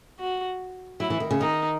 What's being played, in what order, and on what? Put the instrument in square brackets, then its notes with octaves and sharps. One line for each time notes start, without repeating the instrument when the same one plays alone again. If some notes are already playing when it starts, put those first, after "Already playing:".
[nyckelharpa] F#4
[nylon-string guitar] F#3 [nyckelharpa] E4
[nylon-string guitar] E3
D#3
C#3
[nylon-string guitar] D#3 [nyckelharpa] D#4